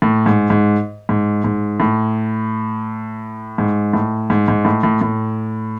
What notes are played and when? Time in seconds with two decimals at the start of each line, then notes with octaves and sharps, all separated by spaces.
0.02 A2
0.26 G#2
0.50 G#2
1.09 G#2
1.44 G#2
1.80 A2
3.58 G#2
3.93 A2
4.30 G#2
4.48 G#2
4.65 A2
4.83 A2
5.01 A2